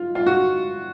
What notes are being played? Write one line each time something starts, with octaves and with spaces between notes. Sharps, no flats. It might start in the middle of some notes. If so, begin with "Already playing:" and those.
Already playing: F4
F4
F#4